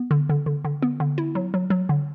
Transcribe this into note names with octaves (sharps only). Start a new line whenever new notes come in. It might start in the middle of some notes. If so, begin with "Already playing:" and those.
Already playing: B3
D3
D3
D3
D3
B3
D3
E4
F#3
F#3
F#3
D3